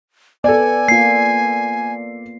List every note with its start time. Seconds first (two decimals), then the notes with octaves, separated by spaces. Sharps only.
0.44 B3 A4 D5 G#5
0.88 A#3 F4 C7